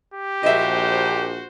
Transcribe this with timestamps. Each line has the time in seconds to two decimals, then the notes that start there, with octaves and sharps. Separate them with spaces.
0.14 G4
0.43 A#1 F#4 C5 D#5 E5